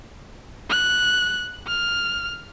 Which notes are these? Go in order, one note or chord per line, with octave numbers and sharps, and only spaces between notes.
F#6
F6